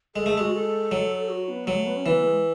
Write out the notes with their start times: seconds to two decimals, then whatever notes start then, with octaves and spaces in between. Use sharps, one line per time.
0.15 G#3 A4
0.26 A3 G#4
0.37 G#3 F#4
0.54 A4
0.91 F#3
1.29 F#4
1.49 B3
1.67 F#3 G#3
1.77 A3
1.86 B3
1.96 C#4
2.05 E3 B3
2.24 G#3